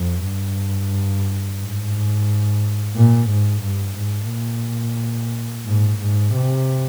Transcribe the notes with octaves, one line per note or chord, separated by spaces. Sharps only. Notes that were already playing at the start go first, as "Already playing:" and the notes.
Already playing: F2
G2
G#2
A#2
G#2
G2
G#2
A#2
G#2
G#2
C3